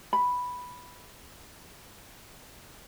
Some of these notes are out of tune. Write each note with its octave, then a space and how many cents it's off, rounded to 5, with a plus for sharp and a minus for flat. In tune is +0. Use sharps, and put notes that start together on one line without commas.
B5 +0